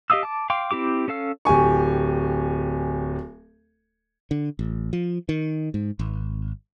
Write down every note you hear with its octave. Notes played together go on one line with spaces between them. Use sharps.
G4 D#5 F5 D#6 E6
A5 D6
F5 G5 C6 D6
C4 E4 G4 D6
C#4 A4 F5 E6
D1 G4 G#5 C#6
D3
A1
F3
D#3
G#2
G#1